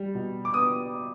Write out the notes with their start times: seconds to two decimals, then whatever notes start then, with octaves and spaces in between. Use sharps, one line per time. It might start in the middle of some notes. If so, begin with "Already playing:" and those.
Already playing: G3
0.15 B2
0.45 D6
0.54 B3 D#6